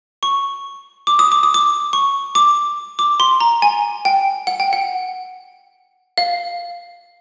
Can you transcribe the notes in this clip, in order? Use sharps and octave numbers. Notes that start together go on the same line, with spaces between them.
C#6
D6
D#6
D6
D#6
D6
C#6
D6
D6
C6
A#5
G#5
G5
F#5
G5
F#5
F5